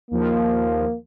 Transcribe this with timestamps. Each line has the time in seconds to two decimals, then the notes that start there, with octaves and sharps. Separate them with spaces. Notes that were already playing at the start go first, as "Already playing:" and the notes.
0.11 D#2 F3 A#3